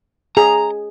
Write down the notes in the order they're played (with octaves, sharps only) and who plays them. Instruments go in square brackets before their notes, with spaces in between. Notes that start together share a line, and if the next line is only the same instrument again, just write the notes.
[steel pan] G#4 [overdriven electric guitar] A#5